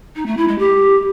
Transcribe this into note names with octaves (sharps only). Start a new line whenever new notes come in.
D#4
A3
E4
G#3
G4